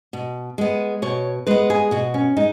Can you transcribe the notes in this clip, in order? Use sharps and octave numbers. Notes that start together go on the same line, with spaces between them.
B2
G#3 B3
B2 C#5
G#3 B3 B4
G#4
B2 F#4
C#4
G#3 D#4